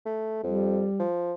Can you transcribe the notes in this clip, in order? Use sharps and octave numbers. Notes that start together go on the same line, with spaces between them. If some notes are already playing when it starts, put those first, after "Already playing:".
A3
F2 G3
F3